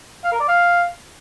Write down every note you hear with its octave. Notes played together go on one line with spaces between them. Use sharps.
F5
A#4
D5
F5